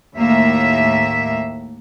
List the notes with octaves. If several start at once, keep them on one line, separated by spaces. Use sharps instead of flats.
D#2 A2 A#3 E5